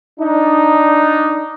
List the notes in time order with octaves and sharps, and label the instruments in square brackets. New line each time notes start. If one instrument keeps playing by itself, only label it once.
[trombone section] D4 D#4